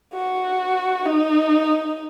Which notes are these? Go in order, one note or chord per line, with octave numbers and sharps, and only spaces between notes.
F#4
D#4